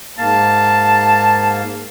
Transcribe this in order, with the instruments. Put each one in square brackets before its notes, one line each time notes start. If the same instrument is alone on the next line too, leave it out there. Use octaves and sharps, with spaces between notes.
[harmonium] G#2 A#3 F5 [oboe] A5